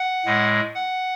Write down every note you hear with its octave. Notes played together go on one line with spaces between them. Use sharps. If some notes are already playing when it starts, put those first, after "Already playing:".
Already playing: F#5
A2 G#3
F#5